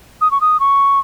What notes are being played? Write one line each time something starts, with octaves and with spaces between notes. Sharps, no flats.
D#6
C#6
D#6
C#6